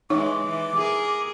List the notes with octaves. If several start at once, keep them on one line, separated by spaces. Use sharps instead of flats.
E3 G#3 D#4 C#5 D6
E3
G#4 A#4